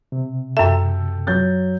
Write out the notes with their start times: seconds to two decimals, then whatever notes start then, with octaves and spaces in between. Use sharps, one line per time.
0.12 C3
0.57 F#2 A4 E5 G5
1.27 F#3 G6 A6